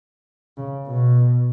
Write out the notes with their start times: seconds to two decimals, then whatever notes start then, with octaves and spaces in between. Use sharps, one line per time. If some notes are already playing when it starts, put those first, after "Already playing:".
0.58 C#3
0.87 B2